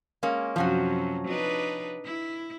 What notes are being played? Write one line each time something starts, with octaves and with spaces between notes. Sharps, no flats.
G#3 A#3 C#4
F#2 C3 F3 F#3 C#4 F#4
D4 D#4 B4
E4